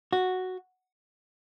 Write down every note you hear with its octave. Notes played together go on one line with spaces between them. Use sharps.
F#4